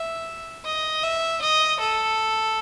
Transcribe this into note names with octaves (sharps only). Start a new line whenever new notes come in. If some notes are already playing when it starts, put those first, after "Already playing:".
Already playing: E5
D#5
E5
D#5
A4